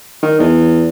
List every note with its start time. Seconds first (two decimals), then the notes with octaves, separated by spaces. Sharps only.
0.23 D#3
0.40 E2